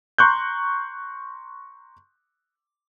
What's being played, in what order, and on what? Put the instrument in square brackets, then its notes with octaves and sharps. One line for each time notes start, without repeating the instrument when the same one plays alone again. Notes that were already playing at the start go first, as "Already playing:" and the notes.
[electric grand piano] A#5 C6 C#6 F#6 G6